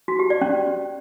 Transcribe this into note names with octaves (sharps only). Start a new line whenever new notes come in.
F#4
G4
D5
C#4